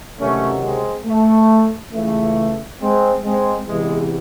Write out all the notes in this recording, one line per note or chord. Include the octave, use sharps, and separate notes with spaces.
C#2 C3 D#3 F#3 A3 C#4
G#3 C4
A3
C#2 C#3 E3 A3
G#3 C4
G#3 C4
E2 C3 E3 G#3